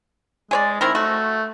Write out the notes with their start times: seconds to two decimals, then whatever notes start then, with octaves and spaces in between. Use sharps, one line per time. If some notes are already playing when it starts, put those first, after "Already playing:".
0.51 G#3 G#4 C#5 D5
0.81 D#3 C4 E4 A#4
0.95 A3 F#4